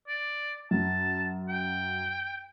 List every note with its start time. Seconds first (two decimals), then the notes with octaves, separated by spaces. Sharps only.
0.08 D5
0.71 F#2 A5
1.49 G5